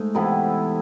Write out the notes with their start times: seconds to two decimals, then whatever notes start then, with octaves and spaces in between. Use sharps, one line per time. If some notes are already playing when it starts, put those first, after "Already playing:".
Already playing: G#2 A3
0.15 C3 E3 B3 E4